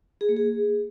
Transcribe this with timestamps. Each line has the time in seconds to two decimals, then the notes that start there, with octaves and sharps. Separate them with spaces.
0.21 G#4
0.29 A#3
0.37 G#4